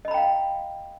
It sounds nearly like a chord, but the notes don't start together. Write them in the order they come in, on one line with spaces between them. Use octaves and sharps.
D#5 B5 A#5 G5 F5